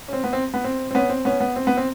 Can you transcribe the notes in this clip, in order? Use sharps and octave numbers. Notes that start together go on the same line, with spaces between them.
C#4
C4
B3
C4
B3
C4
C4
B3 C#4
C4
B3 C#4
B3
C4
B3
C4